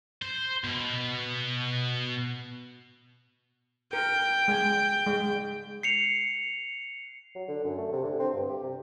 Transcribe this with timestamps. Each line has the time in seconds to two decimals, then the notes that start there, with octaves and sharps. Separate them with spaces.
0.22 C5
0.64 B2
3.93 A#4 G5
4.48 G#3 G#5
5.07 G#3
5.83 C7 C#7 F7
7.35 F#3
7.48 D3
7.64 F#2
7.78 A3
7.92 C3
8.04 D3
8.19 C4
8.34 G2
8.49 G4
8.63 C3